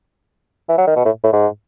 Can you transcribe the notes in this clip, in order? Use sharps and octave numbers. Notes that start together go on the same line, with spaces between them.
E3
F#3
D#3
B2
A2
A2
G#2